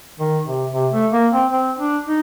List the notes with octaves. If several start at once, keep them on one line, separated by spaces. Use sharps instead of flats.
D#3
C3
C3
A3
A#3
C4
C4
D4
D#4